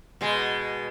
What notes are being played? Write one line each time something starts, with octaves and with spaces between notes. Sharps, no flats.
B2 G#3